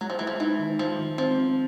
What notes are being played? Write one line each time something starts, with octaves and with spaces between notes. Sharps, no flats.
F#3 G#3
F3
E3 G#3
F3
E3 D#4
D#3
F3 G#3
D#3
F3 C4
C4